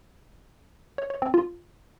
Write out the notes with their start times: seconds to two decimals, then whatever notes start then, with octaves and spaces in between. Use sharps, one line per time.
0.98 C#5
1.10 C#5
1.22 C4
1.34 F4